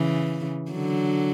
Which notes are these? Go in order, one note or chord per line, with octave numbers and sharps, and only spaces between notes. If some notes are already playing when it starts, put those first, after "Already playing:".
Already playing: C#3 E3
D3 F#3